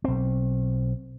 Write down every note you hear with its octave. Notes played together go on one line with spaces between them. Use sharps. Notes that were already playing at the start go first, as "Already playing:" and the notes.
B1 C4